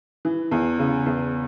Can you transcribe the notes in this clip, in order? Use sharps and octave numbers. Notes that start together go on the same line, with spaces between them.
E3
E2
C#3
E2